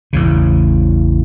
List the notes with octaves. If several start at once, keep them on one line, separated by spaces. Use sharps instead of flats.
A1 E2 C#3